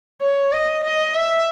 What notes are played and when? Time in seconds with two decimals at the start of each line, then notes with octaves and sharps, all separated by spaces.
0.22 C#5
0.53 D#5
0.84 D#5
1.14 E5